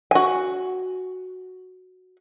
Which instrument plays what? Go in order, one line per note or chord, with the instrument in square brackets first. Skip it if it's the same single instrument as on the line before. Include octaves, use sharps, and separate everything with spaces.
[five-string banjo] F#4 G#5